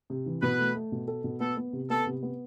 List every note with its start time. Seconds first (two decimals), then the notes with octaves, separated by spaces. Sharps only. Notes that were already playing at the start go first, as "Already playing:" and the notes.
0.10 C3
0.26 E3
0.42 B2 B4
0.59 A3
0.75 A3
0.92 B2
1.08 A4
1.24 B2
1.40 B3 A4
1.57 B3
1.73 C3
1.89 B3 A4
2.06 C3
2.23 B3